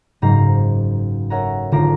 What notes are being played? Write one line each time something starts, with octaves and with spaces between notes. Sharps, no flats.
F#1 G#2 C5 A#5 C7
A#4 C#5 E5 F#5 G#5 A#5
G#1 D3 F4 A5 A#5 D7